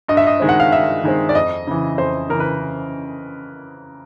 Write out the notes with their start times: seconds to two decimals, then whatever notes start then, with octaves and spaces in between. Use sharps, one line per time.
0.08 G2 D#5
0.17 E5
0.27 D#5
0.40 D#3 G#3 C4
0.49 F#5
0.60 F5
0.71 G2 E5
1.03 D#3 G#3 C4
1.29 D5
1.35 F2 D#5
1.67 C#3 E3
1.98 F2 C5
2.29 C#3 E3 A#4
2.40 B4